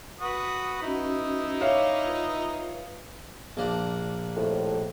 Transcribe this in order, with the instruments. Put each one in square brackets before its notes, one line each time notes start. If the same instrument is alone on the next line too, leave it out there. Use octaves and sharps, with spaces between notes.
[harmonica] F#4 B4 D#6
[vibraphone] C#4 F#4 B4 [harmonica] D#4 E4
[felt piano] C#5 E5 F5 [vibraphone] C#6 D6
[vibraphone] F4 B4
[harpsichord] A#1 A#3 D4
[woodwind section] C2 F2 A2